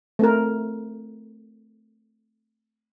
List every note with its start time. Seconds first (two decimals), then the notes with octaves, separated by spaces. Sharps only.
0.19 A3 C4 A#4